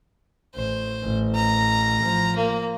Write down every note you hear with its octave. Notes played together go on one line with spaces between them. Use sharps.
A1 C5
A1
A#5
F3
A#3